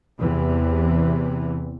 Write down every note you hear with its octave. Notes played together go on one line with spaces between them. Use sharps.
E2 C3 E3